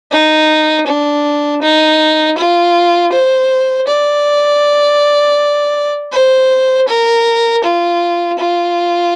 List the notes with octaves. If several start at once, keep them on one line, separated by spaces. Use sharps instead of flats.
D#4
D4
D#4
F4
C5
D5
C5
A#4
F4
F4